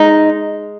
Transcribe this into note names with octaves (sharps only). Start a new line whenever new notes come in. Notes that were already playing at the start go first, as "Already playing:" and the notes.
Already playing: G#3 D#4